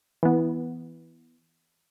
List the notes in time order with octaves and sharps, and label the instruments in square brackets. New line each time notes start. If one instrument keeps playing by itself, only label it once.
[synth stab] E3 B3